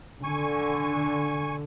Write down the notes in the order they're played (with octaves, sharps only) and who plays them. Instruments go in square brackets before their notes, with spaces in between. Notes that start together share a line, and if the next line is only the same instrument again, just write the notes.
[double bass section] D3 [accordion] G#5 C#6